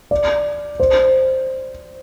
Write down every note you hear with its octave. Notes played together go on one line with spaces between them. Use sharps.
D5
C5